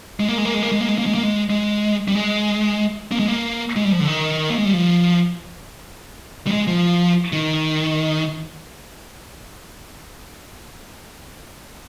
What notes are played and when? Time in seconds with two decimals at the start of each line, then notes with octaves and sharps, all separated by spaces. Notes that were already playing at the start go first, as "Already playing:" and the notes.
0.20 G#3
0.28 A#3
0.38 G#3
0.45 A#3
0.54 G#3
0.63 A#3
0.72 G#3
0.81 A#3
0.89 G#3
0.98 A#3
1.06 G#3
1.15 A#3
1.23 G#3
1.50 G#3
2.08 G3
2.15 G#3
3.11 A#3
3.19 G#3
3.28 A#3
3.76 G#3
3.85 G3
3.92 F3
4.00 D3
4.08 D#3
4.50 A#3
4.58 G#3
4.65 G3
4.73 F3
6.47 G3
6.51 G#3
6.67 F3
7.32 D#3